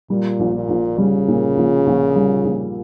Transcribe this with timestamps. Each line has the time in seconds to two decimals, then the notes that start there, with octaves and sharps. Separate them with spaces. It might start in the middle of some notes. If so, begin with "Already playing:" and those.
0.10 A#2 G3
0.40 A#1
0.55 A#2
0.69 A#1
0.98 C#3 G3
1.28 A#2
1.57 A#1
1.87 A#1
2.16 G3
2.45 A#1